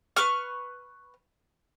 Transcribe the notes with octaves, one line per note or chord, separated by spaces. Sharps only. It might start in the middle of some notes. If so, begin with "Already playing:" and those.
B4 C#6 F6